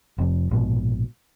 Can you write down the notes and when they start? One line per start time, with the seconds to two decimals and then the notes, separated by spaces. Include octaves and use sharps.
0.18 F1 F2
0.51 A#1 G#2 B2